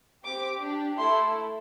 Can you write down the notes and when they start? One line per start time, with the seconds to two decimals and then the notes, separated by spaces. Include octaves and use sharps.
0.24 C4 G4 D6
0.61 D4 G4
0.98 A3 E4 A4 C6